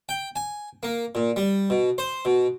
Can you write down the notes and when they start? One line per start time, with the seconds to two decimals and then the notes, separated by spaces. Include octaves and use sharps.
0.09 G5
0.36 G#5
0.83 A#3
1.15 A#2
1.36 G3
1.70 B2
1.98 C5
2.25 B2